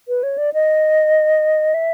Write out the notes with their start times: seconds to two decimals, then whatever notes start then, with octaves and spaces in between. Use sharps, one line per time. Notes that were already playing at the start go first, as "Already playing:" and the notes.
0.08 B4
0.23 C#5
0.38 D5
0.54 D#5
1.74 E5